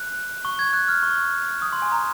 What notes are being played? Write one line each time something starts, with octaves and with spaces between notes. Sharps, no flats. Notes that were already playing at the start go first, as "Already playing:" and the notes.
Already playing: F#6
C#6
G#6
F#6
F6
C#6
D#6
C6
G#5
A#5